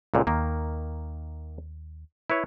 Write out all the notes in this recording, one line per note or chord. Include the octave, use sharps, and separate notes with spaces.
C#2 A#2 D3
D#2 D#3 A#3
E4 B4 C#5